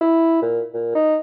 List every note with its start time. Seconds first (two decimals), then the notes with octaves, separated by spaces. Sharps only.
0.01 E4
0.42 A#2
0.74 A#2
0.95 D#4